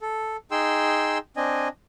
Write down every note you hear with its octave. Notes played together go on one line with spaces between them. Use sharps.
A4
D#4 G#4 G5 C6 E6
C4 D4 D#5 G#5